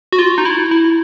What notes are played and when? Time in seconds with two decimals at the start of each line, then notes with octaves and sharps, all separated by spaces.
0.12 F#4
0.19 F4
0.38 D#4
0.45 E4
0.71 E4